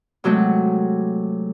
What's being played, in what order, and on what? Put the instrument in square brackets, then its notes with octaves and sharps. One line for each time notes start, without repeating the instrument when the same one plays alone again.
[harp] C3 F#3 G#3 A3